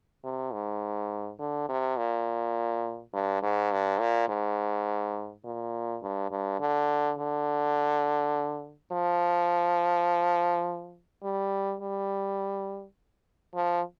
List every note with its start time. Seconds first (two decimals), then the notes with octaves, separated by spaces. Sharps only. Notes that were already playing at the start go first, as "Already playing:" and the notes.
0.24 C3
0.53 G#2
1.39 D3
1.69 C3
1.97 A#2
3.14 G2
3.43 G#2
3.72 G2
4.00 A#2
4.29 G#2
5.45 A#2
6.03 G2
6.31 G2
6.61 D3
7.18 D3
8.92 F3
11.23 G3
11.81 G3
13.55 F3